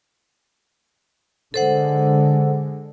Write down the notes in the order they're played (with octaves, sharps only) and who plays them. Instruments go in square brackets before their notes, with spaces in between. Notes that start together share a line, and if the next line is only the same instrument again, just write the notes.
[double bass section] D3 G#3 [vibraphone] A4 C5 F#5